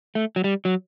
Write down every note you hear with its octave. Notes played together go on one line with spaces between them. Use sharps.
A3
F#3
G3
F#3